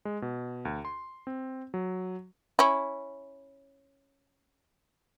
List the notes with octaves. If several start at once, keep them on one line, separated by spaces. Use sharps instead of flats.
G#3
B2
D2
C6
C4
F#3
C#4 E4